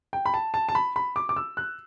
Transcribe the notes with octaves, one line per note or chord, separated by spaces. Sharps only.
G5
B5
A5
A5
A5
B5
B5
D6
D6
E6
F#6